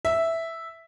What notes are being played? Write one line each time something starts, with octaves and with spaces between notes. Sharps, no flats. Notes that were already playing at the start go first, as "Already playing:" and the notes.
E5